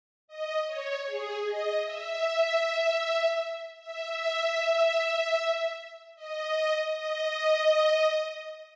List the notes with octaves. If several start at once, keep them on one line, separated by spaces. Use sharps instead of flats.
D#5
C#5
G#4
D#5
E5
E5
D#5
D#5